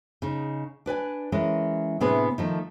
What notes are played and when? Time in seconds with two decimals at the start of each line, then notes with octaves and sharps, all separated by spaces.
0.22 C#3 D#4
0.86 D4 B4 D5 G#5
1.32 E3 G#3 C#4 A#4
2.00 A2 C3 B3 D4 G#4 B4
2.38 D#3 F3 A3